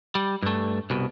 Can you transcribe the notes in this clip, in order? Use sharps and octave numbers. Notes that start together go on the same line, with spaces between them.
G3
G2 A3
C2 B2